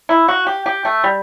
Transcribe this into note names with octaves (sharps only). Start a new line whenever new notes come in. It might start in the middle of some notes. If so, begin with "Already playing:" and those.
E4
F#4
G4
G4
A3
G3